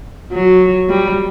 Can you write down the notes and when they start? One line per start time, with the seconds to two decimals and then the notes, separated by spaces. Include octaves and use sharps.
0.32 F#3
0.89 G3